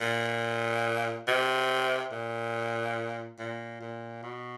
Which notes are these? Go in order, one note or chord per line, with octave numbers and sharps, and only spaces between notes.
A#2
C3
A#2
A#2
A#2
B2